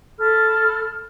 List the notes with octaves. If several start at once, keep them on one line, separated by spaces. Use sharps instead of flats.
A4 B5 F6